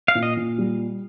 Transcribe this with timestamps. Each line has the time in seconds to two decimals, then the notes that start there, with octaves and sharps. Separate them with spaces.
0.08 F5
0.15 A#2
0.23 D#5
0.37 A#2
0.58 G3